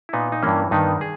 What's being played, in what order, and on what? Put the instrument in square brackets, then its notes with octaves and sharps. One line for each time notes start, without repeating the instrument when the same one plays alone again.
[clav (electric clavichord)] E4
A#2 B3 D#4
D#4
G2 E3 A#3 C#4
G2 D#3 B3 D#4
G#4